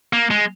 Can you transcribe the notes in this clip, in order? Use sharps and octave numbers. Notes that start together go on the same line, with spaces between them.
A#3
G#3